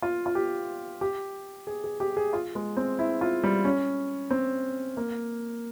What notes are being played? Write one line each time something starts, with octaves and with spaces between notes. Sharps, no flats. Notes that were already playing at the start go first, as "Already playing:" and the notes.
F4
F4
G4
G4
G#4
G#4
G4
G#4
F4
G#3
C4
E4
F4
G3
C#4
C4
A#3